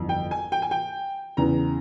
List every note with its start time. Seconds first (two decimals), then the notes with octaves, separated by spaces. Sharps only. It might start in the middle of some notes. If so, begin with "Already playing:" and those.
Already playing: G1 F2 E3
0.09 G5
0.31 G#5
0.52 G5
0.62 G#5
0.71 G5
1.37 E2 C#3 E3 A#5